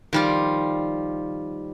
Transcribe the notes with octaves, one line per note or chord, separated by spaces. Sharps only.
D#3 F3 G3 F4 D5